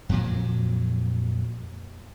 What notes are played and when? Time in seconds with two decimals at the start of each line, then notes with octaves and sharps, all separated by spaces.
0.09 F2 A#2 F#3